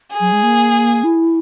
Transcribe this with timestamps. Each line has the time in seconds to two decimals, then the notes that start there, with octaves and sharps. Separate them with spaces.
0.13 G#4
0.20 F#3
0.32 G#3
0.43 A#3
1.04 E4